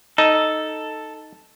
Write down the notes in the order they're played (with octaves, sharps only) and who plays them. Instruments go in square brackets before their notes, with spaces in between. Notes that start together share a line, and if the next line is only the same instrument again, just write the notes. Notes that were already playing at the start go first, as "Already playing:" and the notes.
[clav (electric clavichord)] D#4 [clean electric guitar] A4